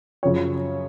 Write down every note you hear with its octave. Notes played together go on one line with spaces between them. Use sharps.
F#2 C#3 F3 C#5